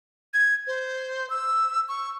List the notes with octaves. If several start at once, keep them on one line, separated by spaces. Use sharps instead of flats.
G#6
C5
E6
C#6